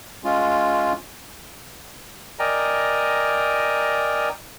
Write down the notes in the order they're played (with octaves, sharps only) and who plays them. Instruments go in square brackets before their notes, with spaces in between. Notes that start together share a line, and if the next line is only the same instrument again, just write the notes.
[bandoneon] G#3 C#4 F4
A#4 D5 D#5 G5 G#5 A#5